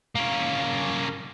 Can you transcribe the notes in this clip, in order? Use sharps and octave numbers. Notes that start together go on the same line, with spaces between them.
A#3 C#4